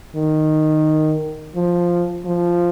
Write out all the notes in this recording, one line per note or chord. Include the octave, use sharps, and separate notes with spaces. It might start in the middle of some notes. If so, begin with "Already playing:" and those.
D#3
F3
F3